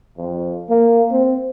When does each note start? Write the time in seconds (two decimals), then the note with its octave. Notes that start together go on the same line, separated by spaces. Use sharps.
0.17 F2
0.69 A#3
1.11 C4